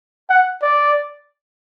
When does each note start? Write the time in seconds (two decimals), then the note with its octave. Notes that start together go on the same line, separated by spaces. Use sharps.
0.30 F#5
0.62 D5